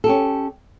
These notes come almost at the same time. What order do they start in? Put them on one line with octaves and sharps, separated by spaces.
A4 G4 C#4